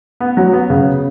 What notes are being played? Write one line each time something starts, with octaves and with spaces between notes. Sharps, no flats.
B3
F#3
B3
C#3